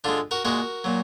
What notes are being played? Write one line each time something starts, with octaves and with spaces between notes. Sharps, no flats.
D3 G#3 D4 F4
F#4 A#4
A#2 G#3 F#4 A#4
A#2 F#3